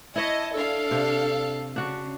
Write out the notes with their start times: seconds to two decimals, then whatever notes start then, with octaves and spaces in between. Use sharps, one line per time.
0.16 E4 C#5 D#5 E5 A5
0.54 D4 A4 F5
0.91 C3
1.76 C#3 D4 F#4